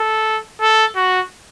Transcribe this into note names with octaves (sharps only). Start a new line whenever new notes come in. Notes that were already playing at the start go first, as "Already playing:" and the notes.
Already playing: A4
A4
F#4